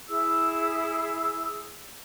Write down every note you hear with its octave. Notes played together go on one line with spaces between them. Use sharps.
E4 G#4 E6